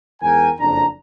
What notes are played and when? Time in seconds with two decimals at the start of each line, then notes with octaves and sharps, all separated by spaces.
0.21 E2 G#2 A#4 G5 G#5
0.59 F#1 F2 D4 A#5